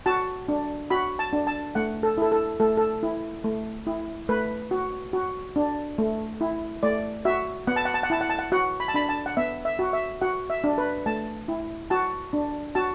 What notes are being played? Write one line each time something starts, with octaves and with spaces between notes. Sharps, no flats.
F#4 A5
D4
F#4 B5
A5
D4
A5
A3 F#5
A4
E4 A4
A4
A3 A4
A4
E4
A3
E4
A3 B4
F#4
F#4
D4
A3
E4
A3 D5
F#4 E5
B3 F#5
A5
F#5
A5
F#5
E4 A5
F#5
A5
F#5
F#4 F#5
B5
A5
D4 B5
A5
F#5
B3 E5
E5
F#4
E5
F#4 F#5
E5
D4
B4
A3 A5
E4
F#4 A5
D4
F#4 A5